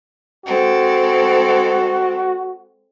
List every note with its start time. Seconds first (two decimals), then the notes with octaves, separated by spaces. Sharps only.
0.45 G#3 C4 F#4 A4